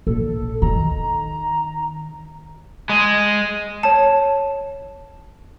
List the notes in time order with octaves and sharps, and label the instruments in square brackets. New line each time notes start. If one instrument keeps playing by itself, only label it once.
[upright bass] A#1 [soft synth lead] A4
[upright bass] D#3 [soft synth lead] A#5
[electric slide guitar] G#3
[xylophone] C#5 A5